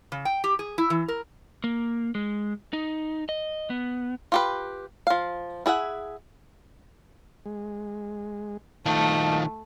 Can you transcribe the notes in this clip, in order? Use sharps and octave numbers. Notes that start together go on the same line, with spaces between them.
C#3
G5
G4
G#4
E4
E3
A#4
A#3
G#3
D#4
D#5
B3
F4 G4 B4
F3 F5
E4 G#4 E5 F#5
G#3
D#3 F3 A3 D#5 F5 A5